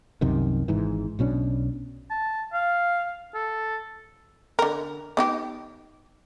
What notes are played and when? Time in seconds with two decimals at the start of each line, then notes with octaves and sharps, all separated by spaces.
0.21 C2 F#2 C3 D#3
0.68 G#1 G#2 E3
1.19 B1 B2 C#4 D4
2.10 A5
2.53 F5
3.34 A4
4.59 D3 A#4
5.17 B3 D#4 G4